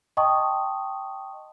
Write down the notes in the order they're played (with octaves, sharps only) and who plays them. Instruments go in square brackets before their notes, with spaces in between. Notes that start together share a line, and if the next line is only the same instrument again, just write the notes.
[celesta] D#5 G5 A5 C6 C#6 D#6